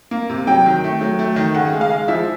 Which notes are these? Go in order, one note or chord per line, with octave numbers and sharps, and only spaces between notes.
A#3
C3
F#3 G5
D#3
A3
F#3
A3
D#3
C#3 F#5
G#3
F5
G#3
F3 E5